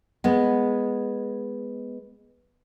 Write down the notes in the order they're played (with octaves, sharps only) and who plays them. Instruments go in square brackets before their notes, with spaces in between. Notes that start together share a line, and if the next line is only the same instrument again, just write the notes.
[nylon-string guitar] G#3 B3